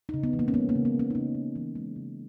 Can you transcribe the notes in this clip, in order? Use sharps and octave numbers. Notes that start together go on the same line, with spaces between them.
D#4
C#3
B3
E3
A#3
C#4
G#3 B3
A#3
C#3
B3
C#3
C#4
D#4
C#3 C#4
C#3
E3
G#3
C#3